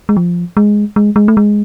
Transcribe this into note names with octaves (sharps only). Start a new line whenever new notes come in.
G#3
F3
G#3
G#3
G#3
A3
G#3